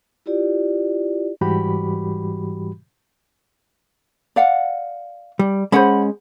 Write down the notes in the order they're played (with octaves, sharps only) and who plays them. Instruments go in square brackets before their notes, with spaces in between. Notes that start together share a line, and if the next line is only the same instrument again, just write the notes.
[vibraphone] E4 F4 G4 D5
[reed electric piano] G#2 E3 G3 F#4 G4 B5
[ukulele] D5 F5 F#5
[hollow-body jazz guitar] G3
[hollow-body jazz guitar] G#3 C#4 [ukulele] C5 F#5 B5